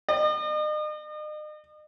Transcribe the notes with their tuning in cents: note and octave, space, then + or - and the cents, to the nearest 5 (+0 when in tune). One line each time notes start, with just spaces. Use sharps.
D#5 -40